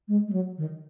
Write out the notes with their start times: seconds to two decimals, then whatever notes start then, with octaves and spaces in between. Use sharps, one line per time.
0.08 G#3
0.28 G#3
0.33 F#3
0.58 D#3